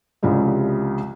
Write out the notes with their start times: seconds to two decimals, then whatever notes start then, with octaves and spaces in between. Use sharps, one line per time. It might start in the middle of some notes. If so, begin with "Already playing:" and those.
0.23 C2 C#3 F3 G3 G#3